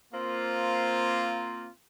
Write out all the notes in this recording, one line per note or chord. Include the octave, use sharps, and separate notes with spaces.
A#3 C4 F4